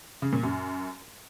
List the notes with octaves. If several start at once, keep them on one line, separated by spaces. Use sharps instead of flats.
C#3
A#2
F#2